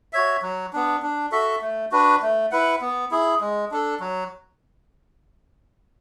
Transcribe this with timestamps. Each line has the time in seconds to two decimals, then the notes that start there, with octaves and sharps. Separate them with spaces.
0.13 F#4 C#5 E5
0.42 F#3
0.73 B3 D4
1.02 D4
1.32 F#4 A4 E5
1.62 A3
1.92 D4 F#4 B4
2.22 A3
2.51 E4 B4 F#5
2.81 B3
3.11 E4 G#4
3.41 G#3
3.71 D4 A4
4.00 F#3